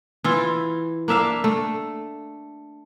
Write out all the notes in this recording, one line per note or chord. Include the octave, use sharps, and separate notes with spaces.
E3 E4 F4
A#3 D4 E5 F5
A3